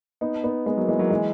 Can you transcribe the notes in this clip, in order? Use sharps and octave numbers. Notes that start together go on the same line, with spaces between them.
B3 D#4
B3 D#4
G#3 B3
F#3 A#3
E3 G#3
F#3 A#3
E3 G#3